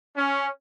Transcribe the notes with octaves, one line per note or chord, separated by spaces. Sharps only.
C#4